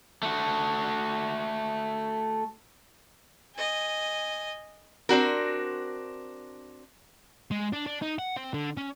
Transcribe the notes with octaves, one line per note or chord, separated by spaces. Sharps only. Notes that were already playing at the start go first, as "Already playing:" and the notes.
A3 F#4
D#5 G#5
C4 D4 F#4 A#4
G#3
D4
D4
D#4
F#5
C4
D3
C#4